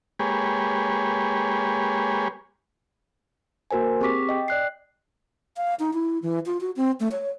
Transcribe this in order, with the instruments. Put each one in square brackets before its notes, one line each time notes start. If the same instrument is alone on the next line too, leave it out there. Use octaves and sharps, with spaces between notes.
[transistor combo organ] G#3 A#3 G4 G#4 B4 C#5
[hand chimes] A#3 F#4 A#4 C5 G#5
C4 G4 G#4 C#6 D6 B6
D#5 G5
D5 F#6 C7
[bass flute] F5
D#4
E4
E3
F4
F#4
C4
A3
C#5